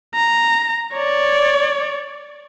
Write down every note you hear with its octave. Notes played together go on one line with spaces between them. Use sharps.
A#5
C#5 D5